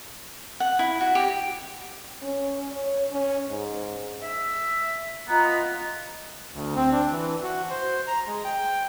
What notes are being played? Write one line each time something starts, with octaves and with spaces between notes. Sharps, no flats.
F#5
E4
F#4
G4
C#4
C#5
C#4
G#2
E5
B3 F4 D#5 A#5
D2
C4
D4
E3
F#4
C5
A#5
G#3
G5